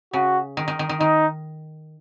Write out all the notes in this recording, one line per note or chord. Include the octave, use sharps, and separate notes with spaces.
C#3 F#4
D#3
D#3
D#3
D#3
D#3 D#4